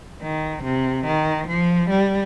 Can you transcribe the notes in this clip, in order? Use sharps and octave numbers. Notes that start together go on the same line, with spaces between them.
D#3
C3
D#3
F3
G3